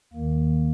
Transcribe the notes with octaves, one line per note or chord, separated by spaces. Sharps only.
D#2 D#3 A#3